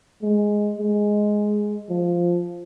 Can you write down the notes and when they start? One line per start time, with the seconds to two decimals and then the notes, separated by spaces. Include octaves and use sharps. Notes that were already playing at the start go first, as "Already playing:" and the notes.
0.22 G#3
0.78 G#3
1.89 F3